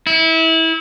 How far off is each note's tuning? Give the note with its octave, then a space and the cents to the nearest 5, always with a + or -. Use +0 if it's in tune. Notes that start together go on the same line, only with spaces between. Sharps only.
E4 -25